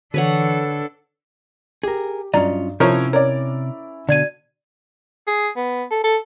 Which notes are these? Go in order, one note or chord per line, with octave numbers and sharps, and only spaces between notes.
D3 E3 D4 A4 B4 C#5 F#5
G4 G#4 A#4
G2 F#3 C#4 F4 D5 D#5 A#5
C3 F3 C#4 E4 A#4 C#5
A#4 C#5 D5
B2 D3 D5 G#6 D#7
G#4
B3
A4
A4